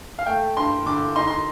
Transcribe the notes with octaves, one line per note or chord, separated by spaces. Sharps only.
F5
A3 G5
G2 C6
D3 D6
D#4 C6
C6